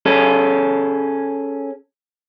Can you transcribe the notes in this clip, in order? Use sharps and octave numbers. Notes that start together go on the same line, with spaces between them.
C#4 G#4 A4